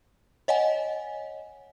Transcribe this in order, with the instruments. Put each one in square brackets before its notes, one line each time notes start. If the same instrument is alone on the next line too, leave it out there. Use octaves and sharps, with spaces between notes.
[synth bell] C#5 D#5 F#5 G#5